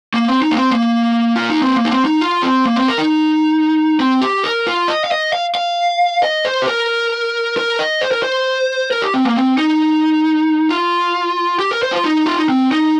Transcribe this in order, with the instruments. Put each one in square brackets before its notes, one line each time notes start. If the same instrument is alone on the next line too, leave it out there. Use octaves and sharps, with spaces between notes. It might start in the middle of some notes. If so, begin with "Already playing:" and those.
[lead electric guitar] A#3
C4
D#4
A#3
C4
A#3
F4
D#4
C4
A#3
D#4
C4
D#4
F4
C4
A#3
C4
A#4
D#4
C4
G4
A#4
F4
D#5
F5
D#5
F5
F5
D#5
C5
G4
A#4
A#4
D#5
C5
A#4
C5
A#4
G4
C4
A#3
C4
D#4
F4
G4
A#4
C5
F4
D#4
F4
D#4
C4
D#4